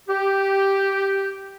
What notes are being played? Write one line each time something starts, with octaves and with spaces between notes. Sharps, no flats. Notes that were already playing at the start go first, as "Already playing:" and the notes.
G4